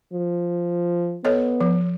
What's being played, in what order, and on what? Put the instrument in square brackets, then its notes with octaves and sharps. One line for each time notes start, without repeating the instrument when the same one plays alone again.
[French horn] F3
[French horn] B3 [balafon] A4 C#5 D#5
[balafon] F3